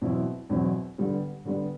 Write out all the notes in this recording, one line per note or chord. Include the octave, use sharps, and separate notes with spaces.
E2 B2 F#3 C4 E4
E2 B2 F#3 C4 E4
D3 G3 B3
D3 G3 B3